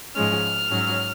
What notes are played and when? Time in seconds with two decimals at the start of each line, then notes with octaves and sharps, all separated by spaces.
0.15 G#2 F3 G#3 C#4 F6
0.71 G#2 F#3 C#4